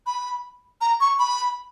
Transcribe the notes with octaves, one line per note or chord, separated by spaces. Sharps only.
B5
A#5
C#6
B5